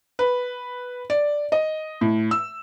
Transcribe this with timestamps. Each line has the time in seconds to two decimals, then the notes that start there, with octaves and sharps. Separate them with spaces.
0.19 B4
1.10 D5
1.52 D#5
2.01 A2
2.31 E6